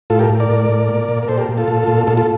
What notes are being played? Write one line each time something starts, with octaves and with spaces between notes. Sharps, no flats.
A2 F4 A4
G4 A#4
A2
A#4 D5
A2
A2
A#2
A#2
A#4
A#2 A4 C5
G4 A#4
A#2
F4 A4
A#2
A#2
A#2 F4 A4
F4 A4